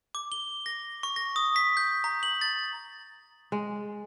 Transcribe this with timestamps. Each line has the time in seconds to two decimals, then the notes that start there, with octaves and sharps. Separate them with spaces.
0.15 D6
0.32 G7
0.66 A#6
1.03 C#6
1.16 A#6
1.36 D#6
1.56 B6
1.77 G6
2.04 A#5
2.23 F#7
2.41 A6
3.52 G#3